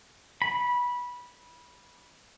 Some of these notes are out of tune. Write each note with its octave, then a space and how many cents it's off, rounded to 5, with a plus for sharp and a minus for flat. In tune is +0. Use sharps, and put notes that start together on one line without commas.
B5 -15